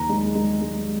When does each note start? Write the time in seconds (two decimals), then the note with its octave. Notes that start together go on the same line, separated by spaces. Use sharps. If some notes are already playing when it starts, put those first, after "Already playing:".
Already playing: D#2 A#5
0.09 G#3
0.35 G#3
0.61 G#3